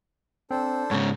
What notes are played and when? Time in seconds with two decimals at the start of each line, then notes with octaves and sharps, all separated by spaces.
0.51 C4 D4 A4 C5
0.91 G#2 C#3 C#5